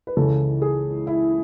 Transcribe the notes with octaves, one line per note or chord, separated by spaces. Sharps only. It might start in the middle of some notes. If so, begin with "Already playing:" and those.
B4
C#2 C#3 E3 A4
G#4
E4